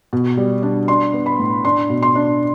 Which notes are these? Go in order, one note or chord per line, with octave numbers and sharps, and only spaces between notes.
B2
G3
D4
D4 C6
B3
B5
A2
D4 C6
B2
C6
D4